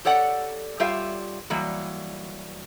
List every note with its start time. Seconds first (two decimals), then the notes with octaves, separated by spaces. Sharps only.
0.05 G4 A4 C#5 D5 F#5
0.80 G3 F4 G4 C#5 E5 F5
1.50 E3 F#3 G3 A#3